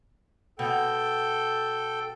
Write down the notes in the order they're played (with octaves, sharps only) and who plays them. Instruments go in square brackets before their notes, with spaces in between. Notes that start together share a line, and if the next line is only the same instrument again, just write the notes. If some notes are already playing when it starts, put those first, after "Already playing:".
[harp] B2 [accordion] A4 G5